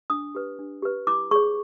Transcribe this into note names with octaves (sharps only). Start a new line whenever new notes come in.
D4 D#6
G4 B4
D4
G4 B4
E4 D6
G#4 C#5 C#6